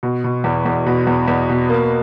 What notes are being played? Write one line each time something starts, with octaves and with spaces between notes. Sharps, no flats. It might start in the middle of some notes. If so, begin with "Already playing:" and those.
B2
B2
E2
E2
B2
E2
E2
B2
A#3